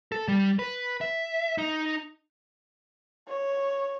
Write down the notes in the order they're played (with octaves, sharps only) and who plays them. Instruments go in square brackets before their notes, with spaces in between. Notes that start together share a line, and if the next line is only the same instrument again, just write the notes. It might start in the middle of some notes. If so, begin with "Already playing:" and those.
[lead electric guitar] A4
G3
B4
E5
D#4
[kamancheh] C#5